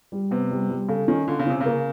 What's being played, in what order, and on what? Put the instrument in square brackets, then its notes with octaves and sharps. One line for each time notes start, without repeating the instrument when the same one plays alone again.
[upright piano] G3
[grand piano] C3 [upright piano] B3
[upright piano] G3
G3
[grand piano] C#3 [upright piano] A4
[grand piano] D#3 [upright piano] C#4
[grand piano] D3 [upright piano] F4
[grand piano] C#3
[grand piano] C3 [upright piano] C#4
[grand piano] C#3 [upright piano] A#3